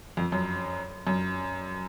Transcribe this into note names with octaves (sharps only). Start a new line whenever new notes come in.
F2
F#2
F#2